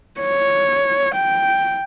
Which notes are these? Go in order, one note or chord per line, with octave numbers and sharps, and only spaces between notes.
C#5
G5